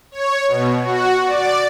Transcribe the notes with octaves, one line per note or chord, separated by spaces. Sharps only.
C#5
B2
F#4
D5